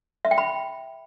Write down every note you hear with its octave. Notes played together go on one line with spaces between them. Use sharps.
E5
G5
B5